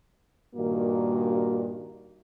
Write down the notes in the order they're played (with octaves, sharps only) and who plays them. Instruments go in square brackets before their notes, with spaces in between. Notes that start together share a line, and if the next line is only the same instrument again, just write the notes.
[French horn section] G2 A#2 D#3 A#3 F#4